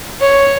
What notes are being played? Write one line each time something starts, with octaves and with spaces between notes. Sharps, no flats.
C#5